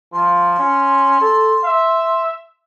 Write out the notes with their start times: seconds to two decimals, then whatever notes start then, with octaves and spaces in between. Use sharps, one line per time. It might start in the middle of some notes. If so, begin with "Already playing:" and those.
0.13 F3 C6
0.59 C#4
1.21 A4
1.64 E5